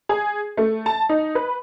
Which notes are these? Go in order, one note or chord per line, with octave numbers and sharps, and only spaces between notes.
G#4
A3
A5
D#4
B4